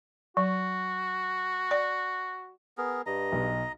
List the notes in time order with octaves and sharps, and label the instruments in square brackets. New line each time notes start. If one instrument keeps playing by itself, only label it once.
[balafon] F#3 [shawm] F#4
[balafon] D5
[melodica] B3 G#4 A#4
[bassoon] G2 [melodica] D#5 A#5
[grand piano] B1